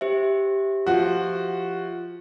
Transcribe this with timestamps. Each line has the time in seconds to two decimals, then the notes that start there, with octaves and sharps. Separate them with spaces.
0.01 G4 C5 E5
0.87 F3 F#4